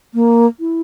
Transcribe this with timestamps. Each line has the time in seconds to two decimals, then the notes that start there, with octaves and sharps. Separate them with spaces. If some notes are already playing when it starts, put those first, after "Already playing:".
0.14 A#3
0.60 E4